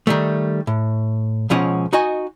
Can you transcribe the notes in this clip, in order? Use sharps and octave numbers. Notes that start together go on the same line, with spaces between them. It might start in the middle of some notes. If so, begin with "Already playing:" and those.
D#3 G3 A3
A2
C#2 B2 F3 C#4 C#5 F#5
D#4 F#4 D#5 G#5